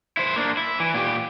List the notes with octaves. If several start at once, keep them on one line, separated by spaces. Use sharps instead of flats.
E4 C5
A#3 D4
E4
E3
A#2 G4